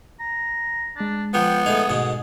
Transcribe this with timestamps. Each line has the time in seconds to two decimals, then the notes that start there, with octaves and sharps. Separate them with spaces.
0.20 A#5
0.96 G#3 D4 A6
1.34 F3 B3 G5
1.66 A2 D#4 G#4
1.90 G#2 B2